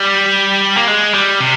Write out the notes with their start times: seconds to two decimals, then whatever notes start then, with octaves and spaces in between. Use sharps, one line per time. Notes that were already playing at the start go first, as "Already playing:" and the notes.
Already playing: G3
0.77 A#3
0.87 G#3
1.14 G3
1.40 C3